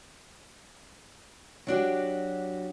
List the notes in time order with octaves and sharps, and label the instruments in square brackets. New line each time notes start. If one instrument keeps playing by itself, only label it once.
[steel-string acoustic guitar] F#3 D4 F#4 G4